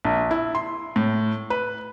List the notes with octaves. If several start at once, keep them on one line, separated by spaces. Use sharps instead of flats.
A#1
E4
C6
A2
B4